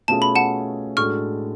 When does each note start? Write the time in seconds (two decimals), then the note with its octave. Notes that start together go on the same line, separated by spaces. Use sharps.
0.08 B2 A3 C#4 F4 G#4 A5
0.22 B5
0.35 F#5 A5
0.97 A2 G#3 D4 F#4 A4 C#6 F6